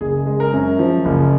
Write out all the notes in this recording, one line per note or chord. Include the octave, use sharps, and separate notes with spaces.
F#1 G#4
G#3
A#4
F#2
F3
F#1